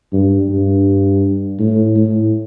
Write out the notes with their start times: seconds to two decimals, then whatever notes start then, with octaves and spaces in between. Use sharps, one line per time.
0.13 G2
0.49 G2
1.59 A2
1.96 A2